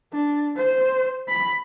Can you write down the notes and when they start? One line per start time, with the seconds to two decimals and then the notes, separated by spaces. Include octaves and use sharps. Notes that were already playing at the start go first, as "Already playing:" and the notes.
0.12 D4
0.56 C5
1.28 B5